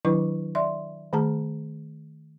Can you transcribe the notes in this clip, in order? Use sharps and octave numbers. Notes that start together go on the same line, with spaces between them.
D#3 F#3 D4 E4 B4 C#6
D5 E5 C6
D#3 A3 G#4 A5 A#5